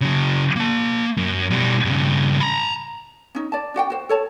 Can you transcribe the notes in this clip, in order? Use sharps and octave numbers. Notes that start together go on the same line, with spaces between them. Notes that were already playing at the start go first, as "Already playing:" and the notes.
C#3 F#3
A#3 A5
F#2
B2 G3
G2 C#3
A#5 B5
C#4 D#4
D5 A5
D4 F#4 F#5 G5
F#4 C5
A4 C#5 A5